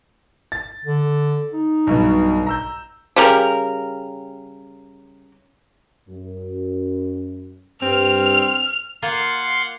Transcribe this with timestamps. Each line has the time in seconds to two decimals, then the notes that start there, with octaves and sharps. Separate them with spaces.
0.52 A6
0.85 D3
1.53 D#4
1.87 B1 G2 B2
2.47 A#5 E6 G6
3.16 C#3 G3 A#4
6.08 F#2
7.82 G2 C4 F6
9.02 A#3 F4 F5 F#5 C6